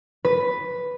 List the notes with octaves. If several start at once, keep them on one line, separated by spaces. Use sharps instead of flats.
B4